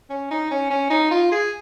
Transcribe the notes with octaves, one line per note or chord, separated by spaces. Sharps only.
C#4
D#4
C#4
C#4
D#4
F4
G#4